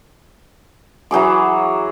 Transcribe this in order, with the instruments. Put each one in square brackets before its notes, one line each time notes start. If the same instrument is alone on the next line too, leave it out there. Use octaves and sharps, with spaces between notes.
[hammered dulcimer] E3 F#3 G#4 D6